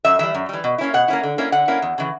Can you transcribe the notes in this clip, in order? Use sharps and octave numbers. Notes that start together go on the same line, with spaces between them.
F#2 E5
E3 G3 E5
F#2
E3 G3
B2
A#3 C#4 E4
B2 F#5
A#3 C#4 E4
D3
A#3 C#4 E4
D3 F#5
A#3 C#4 E4
E2
C#3 E3